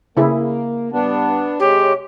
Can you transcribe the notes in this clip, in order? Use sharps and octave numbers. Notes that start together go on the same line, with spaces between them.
C#3 A#3 E4 G#4
G2 B3 D4
C3 G#3 G4 C#5